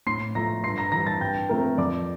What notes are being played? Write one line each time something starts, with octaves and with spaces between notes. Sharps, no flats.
A2 C6 C7
F3 A3 A#5 A#6
G2 C6 C7
A#5 A#6
E3 G3 A#5 A#6
A5 A6
G2 G5 G6
F3 A3 C4 A#4 A#5
F2 D5 D6